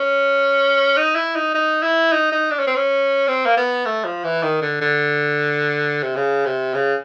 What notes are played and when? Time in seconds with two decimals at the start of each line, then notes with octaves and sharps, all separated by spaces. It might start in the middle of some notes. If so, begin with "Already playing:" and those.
Already playing: C#4
0.97 D#4
1.15 E4
1.36 D#4
1.54 D#4
1.83 E4
2.12 D#4
2.32 D#4
2.51 D4
2.59 C#4
2.67 C4
2.76 C#4
3.28 C4
3.46 A#3
3.57 B3
3.86 A3
4.05 F3
4.24 E3
4.43 D#3
4.62 D3
4.81 D3
6.03 C3
6.16 C#3
6.45 C3
6.74 C#3